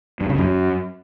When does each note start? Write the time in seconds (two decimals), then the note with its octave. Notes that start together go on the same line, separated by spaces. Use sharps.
0.21 G2
0.29 C#3
0.38 F#2